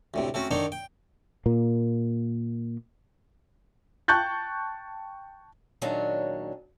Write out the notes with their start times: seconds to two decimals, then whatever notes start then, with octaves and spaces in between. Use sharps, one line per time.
0.14 D2 A2 C3
0.34 A3 C4 C#4 F#4
0.51 D3 D#3 D4 D#4 C5 C#5
0.72 G5
1.46 A#2 A#3
4.08 G5 A5 C#6 F#6 G6 A6
5.82 A#2 D#3 F#3 G#3 C#4 D4